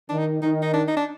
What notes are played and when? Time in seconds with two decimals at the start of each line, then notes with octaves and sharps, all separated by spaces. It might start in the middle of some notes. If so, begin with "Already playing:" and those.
0.09 D#3 D4
0.18 D#4
0.42 D#3 D#4
0.62 D#4
0.73 D4
0.88 D#4
0.96 D4